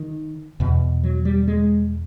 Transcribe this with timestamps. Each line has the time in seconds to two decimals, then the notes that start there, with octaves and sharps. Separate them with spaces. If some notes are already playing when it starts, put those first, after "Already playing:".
Already playing: D#3
0.60 E2 B2
1.03 F#3
1.25 G3
1.48 G#3